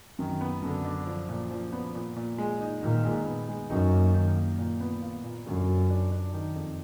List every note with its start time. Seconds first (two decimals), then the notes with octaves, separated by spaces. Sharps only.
0.19 F#2 D#3
0.41 B3
0.62 F#2 D3
0.85 D4
1.07 F3
1.29 A#2
1.51 F3
1.73 B3
1.95 A#2
2.16 A#2
2.38 G#3
2.60 D#4
2.82 A#2 D#3
3.04 G#3
3.26 B3
3.49 G#3
3.70 F#2 D#4
3.92 A#3
4.14 D#3
4.36 A#3
4.58 A#2
4.80 B3
5.02 F4
5.24 A#2
5.46 F#2 D3
5.68 F#3
5.90 D4
6.12 D4
6.34 D#3
6.56 F2